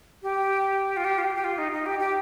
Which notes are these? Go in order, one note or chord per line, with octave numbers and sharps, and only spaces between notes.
G4
F4
G4
F4
G4
G4
F4
D#4
D#4
G4
G4